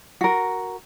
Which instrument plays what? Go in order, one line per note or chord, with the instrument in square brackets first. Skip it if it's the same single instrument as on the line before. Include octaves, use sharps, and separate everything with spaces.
[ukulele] F#4 A#4